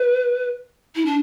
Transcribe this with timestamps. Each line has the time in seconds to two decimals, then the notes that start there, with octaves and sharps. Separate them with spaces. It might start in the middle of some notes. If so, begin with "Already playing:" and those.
Already playing: B4
0.95 E4
1.05 D4